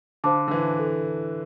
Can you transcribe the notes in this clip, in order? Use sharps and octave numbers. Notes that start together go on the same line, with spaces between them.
D3 C5 F5 A5 D6
D3
E3
A4